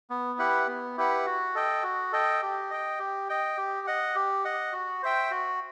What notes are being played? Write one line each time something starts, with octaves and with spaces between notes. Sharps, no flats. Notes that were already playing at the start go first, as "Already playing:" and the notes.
B3
E4 G4 B4 F#5
B3
E4 G4 B4 F#5
F#4
A4 D#5 G5
F#4
A4 D#5 G5
G4
D#5 G5
G4
D#5 G5
G4
D#5 F#5
G4
D#5 F#5
F#4
C5 E5 G5
F#4